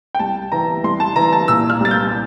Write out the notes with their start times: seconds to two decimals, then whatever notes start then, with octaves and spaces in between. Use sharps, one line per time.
0.15 G5
0.19 C2 A5
0.52 E3 A#5
0.84 C2 C6
1.00 A5
1.16 E3 A#5
1.33 A5
1.48 A#2 E6
1.70 F6
1.80 C2 A6
1.91 G6